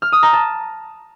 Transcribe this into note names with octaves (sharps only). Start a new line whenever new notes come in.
F6
D#6
A#5
A5